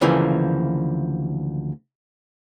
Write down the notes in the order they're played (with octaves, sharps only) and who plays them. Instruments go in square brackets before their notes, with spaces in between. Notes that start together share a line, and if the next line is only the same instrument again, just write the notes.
[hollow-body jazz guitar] D2 C#3 E3 F3 A#3